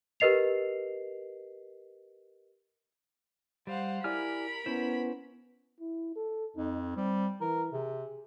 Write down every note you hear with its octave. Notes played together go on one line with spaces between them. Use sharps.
G4 A#4 B4 D#5 C7 F7
G3 C5 F5 F#5
E4 G4 A#4 D5 G#5 B5 F6
B3 C#4 E4 C5
E4
A4
F2 D#4
G3 C4
E3 A#4
C3 G#4